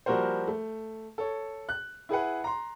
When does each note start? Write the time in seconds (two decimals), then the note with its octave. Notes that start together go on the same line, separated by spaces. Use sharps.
0.06 F3 G3 A#3 F#4 A#4 C5
0.48 A3
1.18 A4 C#5
1.69 F#6
2.09 E4 G#4 B4 F#5
2.44 A#5 C6